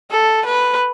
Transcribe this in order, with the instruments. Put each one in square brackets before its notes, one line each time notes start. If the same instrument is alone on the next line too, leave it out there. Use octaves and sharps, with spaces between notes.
[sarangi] A4
B4